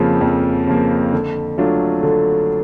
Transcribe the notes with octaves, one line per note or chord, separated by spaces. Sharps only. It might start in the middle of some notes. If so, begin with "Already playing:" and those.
Already playing: F2 C#3 F3 A#3
F2
C#3 F3 A#3
D3
F#3 A3 D4 F4
D3